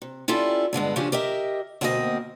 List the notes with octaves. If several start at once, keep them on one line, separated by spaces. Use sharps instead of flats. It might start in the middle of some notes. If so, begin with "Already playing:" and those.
C3
C#4 E4 F4 G4 A4 D5
G2 D3 G#3 B3
C#3 F3 C#4 D4 G4 A4
G4 A#4 D#5 E5
D2 B2 A#3 C4 G4 D#5